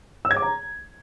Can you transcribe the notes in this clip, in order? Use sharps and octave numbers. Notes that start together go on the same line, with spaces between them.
E6
G#6
D6
A#5